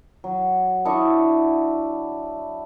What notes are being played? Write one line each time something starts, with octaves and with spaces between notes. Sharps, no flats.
F#3
D4 E4 D#5 C#6